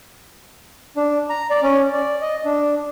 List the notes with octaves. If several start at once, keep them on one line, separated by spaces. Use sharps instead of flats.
D4
A#5
D5
C#4
D5
D#5
D4